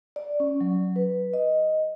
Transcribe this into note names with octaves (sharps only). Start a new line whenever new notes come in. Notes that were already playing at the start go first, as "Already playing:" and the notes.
D5
C#4
F#3
B4
D#5